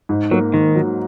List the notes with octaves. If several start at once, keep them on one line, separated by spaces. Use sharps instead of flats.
G#2
F#3 A#3
G#2 D#3
F#3